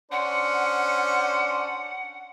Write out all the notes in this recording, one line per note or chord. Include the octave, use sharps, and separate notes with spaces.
C#4 D4 C5 F#5